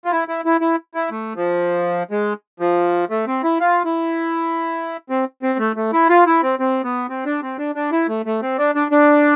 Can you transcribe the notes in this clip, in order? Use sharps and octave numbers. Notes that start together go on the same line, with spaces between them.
F4
E4
E4
E4
E4
E4
A3
F3
G#3
F3
A3
C4
E4
F4
E4
C4
C4
A3
A3
E4
F4
E4
C4
C4
B3
C4
D4
C4
D4
D4
E4
A3
A3
C4
D4
D4
D4